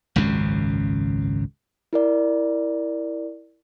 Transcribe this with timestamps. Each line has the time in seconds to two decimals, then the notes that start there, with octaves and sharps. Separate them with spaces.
0.16 G#1 C#2 F#2 C#3
1.93 E4 A#4 D5